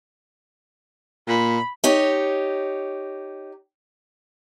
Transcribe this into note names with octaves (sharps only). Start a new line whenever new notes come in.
A#2 B5
D#4 G4 C#5